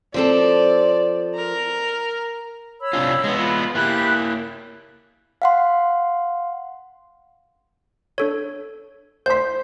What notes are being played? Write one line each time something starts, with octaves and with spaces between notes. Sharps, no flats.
F3 C4 A4 D5
A#4
C#5 B5 E6
C3 D4 F4
G#3 B3
F4 B5
A#3 E4 G4 B5 F#6
F5 F#5 C6
D4 A4 C#5
C5 C6 G6 B6